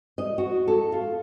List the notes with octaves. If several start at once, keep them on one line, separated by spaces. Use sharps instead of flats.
D#5
F#4
A4
F4